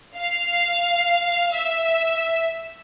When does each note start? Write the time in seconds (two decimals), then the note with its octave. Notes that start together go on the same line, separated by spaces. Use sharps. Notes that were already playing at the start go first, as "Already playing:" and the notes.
0.18 F5
1.54 E5